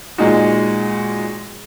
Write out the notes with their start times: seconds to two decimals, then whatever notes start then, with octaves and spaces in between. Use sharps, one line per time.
0.18 A#2 G#3 D#4 F#4